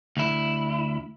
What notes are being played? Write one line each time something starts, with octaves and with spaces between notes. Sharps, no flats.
D2 E4